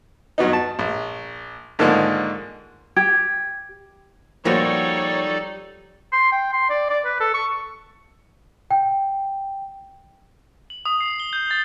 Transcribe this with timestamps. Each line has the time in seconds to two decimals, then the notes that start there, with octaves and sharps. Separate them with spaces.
0.38 G2 F#3 B3 D#4
0.53 A5
0.79 A#1
1.79 G#2 D3 D#3 F3 G#3 A#3
2.97 G4 G#6
4.45 F3 G3 A#3 D#4 F#4 A4 C#5 D5
6.13 C6
6.32 G5
6.53 C6
6.70 D5
6.90 D5
7.05 B4
7.20 A4
7.34 C#6
8.71 G5
10.70 F#7
10.85 D#6
11.01 C7
11.20 G7
11.33 G6
11.51 A6